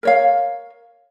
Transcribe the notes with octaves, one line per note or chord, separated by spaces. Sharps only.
A#4 C#5 F5